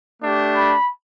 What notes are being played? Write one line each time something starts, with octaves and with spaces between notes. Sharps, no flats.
A3 D4 G4
B5